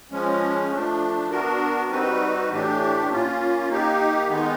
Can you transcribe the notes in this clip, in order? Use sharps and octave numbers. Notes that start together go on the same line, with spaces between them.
F3 G#3 C#4
F3 A3 D4
B3 D4 F#4 A#4
G3 C4 D#4 F#4 B4
A2 E3 A3 D4 G4
A#3 C#4 F4
A#3 D#4 G4
D#3 G#3 B3 D#4